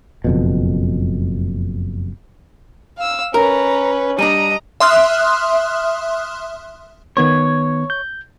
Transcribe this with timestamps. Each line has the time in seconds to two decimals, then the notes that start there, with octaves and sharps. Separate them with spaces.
0.24 F#1 F2 B2
2.97 F5 E6
3.34 C#4 A#4 B4 A#5
4.19 G3 D4 D#5 A#5 D#7
4.80 E5 C6 D#6 F6 F#6
7.17 D#3 B3 C#5 G#6
7.90 G6